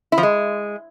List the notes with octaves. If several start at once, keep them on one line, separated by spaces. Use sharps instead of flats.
E4
F3
G#3